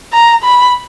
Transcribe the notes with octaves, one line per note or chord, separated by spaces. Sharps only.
A#5
B5